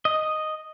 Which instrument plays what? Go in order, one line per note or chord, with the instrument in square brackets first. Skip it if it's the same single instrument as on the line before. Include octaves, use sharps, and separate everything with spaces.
[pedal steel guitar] D#5